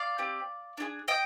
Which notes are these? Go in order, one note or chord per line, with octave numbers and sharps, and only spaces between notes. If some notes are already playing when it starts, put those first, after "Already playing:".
Already playing: D5 F5
C4 G4
D4 F4 G#4
D#5 G5